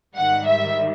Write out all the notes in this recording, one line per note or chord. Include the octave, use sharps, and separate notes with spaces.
G#2 D#3 G3 F#5
E5